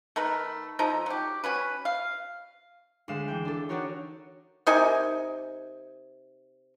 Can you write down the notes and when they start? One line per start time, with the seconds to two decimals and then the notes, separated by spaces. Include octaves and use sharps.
0.16 D#3 A3 A#4 B4
0.79 F3 D#4 A4 A#5
1.06 F#3 G4
1.44 C#4 F#4 B4
1.85 F5
3.08 D2 G#3 F5 E7
3.28 E3 G5
3.45 D4 A4
3.69 D4 D#4 F#4 G4 A#4 C#5
4.67 C3 D#4 A#4 G#5